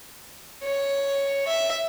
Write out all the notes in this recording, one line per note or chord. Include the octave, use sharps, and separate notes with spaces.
C#5
E5